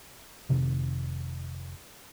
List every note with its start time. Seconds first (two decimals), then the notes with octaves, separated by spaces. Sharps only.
0.49 F1 C3 D#3